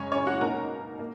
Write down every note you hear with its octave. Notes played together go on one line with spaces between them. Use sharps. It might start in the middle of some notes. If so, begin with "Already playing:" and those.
Already playing: F#2 C#3 G#3 C#4 C#5
C#4 C#5
F#4 F#5
B2 A#3 D#4 A#4 A#5
A#3